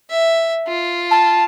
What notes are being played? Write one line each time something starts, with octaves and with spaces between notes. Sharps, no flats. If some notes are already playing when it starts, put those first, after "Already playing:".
E5
F4
A5